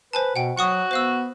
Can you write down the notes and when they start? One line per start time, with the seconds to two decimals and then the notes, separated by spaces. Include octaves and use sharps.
0.13 B4 C5 G#5 A5
0.36 B2 F#5 G5
0.58 F#3 F#4 F#5 C#6 D#6
0.91 B3 C5 F5 E6